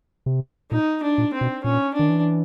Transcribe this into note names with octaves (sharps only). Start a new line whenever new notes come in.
C3
A#2 D#4
D4
A#2
C4
B2
A#2 C#4
D4
D#3
E3